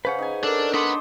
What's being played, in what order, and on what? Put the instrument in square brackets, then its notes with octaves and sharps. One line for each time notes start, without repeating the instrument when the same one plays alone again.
[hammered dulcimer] C#3 C#4 [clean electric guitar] B4 C5 F#5
[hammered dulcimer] D#4 G#5
[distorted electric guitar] D4 [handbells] A4 A#4
[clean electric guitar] D4 [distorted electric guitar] B4 F#5 [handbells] C6 D6 D#6